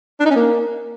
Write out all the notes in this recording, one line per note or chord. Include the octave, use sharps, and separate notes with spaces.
D4
D#4
C#4
A#3